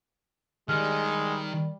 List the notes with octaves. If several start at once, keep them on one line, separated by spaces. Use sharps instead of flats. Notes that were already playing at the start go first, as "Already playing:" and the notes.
D#3 G3 G#3 F6